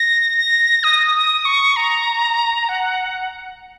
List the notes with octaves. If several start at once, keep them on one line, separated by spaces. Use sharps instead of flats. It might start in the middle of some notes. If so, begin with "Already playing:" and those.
Already playing: A#6
A#6
D#6
D#6
C#6
A#5
F#5